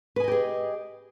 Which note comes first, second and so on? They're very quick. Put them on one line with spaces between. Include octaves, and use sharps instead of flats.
B4 G#5 D#5 G4 G#4